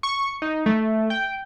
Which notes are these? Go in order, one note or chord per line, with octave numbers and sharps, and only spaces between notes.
C#6
D#4
A3
G5